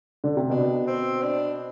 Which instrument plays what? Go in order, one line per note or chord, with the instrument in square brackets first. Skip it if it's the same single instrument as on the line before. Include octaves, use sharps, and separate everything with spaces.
[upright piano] D3
C3
[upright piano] B2 [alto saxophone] D4
[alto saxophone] C4
D4